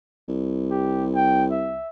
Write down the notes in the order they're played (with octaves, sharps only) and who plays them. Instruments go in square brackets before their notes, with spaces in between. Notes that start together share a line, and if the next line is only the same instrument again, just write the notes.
[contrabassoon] C2
[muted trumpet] G4
G5
E5